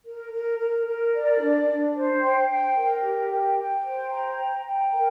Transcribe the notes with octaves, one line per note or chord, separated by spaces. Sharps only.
A#4
A#4
A#4
A#4
D5
D4
D4
C5
G5
G5
A#4
G4
G5
G5
C5
A#5
G5
G5
A#4